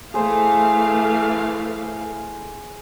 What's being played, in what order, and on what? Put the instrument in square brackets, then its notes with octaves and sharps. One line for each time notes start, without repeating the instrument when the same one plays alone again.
[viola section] E3 A3 F5 [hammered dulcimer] G#4 C5